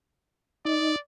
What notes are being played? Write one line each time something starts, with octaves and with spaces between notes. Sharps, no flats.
D#4 D5